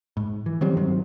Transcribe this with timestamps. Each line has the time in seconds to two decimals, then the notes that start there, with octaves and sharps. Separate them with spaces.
0.17 G#2
0.46 E3
0.61 D#3 F#3 G3 C4
0.77 G2 D#3 F#3 C4